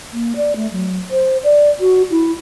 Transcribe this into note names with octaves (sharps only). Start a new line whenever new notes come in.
A#3
D5
A3
F#3
C5
D5
F#4
E4